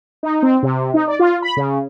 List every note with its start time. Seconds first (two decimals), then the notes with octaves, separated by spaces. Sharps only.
0.23 D#4
0.42 C4
0.63 C3
0.94 D#4
1.08 D5
1.19 F4
1.42 B5
1.57 C#3